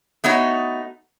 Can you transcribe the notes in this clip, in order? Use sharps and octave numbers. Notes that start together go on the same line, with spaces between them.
A3 B3 D#4 F#4 C#5